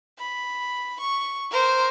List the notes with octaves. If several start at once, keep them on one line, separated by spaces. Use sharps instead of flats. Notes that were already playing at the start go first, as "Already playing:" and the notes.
B5
C#6
A#4 C5